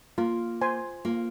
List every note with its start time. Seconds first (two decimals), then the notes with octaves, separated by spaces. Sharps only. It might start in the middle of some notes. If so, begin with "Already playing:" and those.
0.18 A#3 F4
0.61 C5 G#5 C6
1.05 A#3 F4